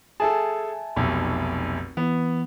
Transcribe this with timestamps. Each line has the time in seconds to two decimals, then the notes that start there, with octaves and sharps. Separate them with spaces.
0.20 G#4 A4 E5 G#5 A5
0.96 F1 B1
1.97 E3 B3